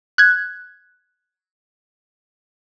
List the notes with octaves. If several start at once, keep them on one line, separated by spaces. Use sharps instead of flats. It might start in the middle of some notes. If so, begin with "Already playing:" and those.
F#6 G#6